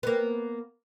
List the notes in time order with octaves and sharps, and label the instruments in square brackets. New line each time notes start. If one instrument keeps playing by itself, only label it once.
[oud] A#3 B3